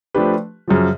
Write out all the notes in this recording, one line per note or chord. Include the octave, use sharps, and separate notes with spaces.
F3 A3 D4 G4 B4
F#2 C#3 F3